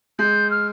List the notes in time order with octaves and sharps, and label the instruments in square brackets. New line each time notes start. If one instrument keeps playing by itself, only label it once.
[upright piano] G#3 [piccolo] G6
[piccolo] F6